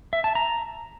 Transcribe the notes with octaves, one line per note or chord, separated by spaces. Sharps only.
E5
A5
A#5